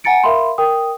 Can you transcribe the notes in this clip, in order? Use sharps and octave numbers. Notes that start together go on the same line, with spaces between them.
F#5 G#5 A#5 A6 C#7 D7
A#4 E5 F5 B5 C6
A#4 G5 D#6